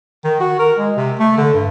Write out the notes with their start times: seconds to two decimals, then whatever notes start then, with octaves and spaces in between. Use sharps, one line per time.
0.24 D#3
0.40 F#4
0.59 A#4
0.78 G#3
0.97 C3
1.19 A3
1.38 D3
1.54 G2